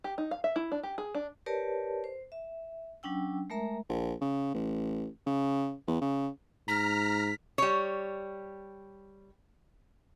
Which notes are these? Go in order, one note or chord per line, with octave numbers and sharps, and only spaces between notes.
G4
D#4
F5
E5
E4
D4
G4
G#4
D4
G4 A#4 B4 C#5 D5 A5
C5
E5
F#3 C#4 D4 G5 E6
G#3 A3 A#4 E5 A#5
A#1
C#3
A1
C#3
E2
C#3
G#2 A#5 F6 B6
G3 C#5